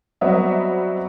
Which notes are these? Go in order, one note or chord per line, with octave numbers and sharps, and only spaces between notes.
F#3 G3 B3 C4 D#5 E5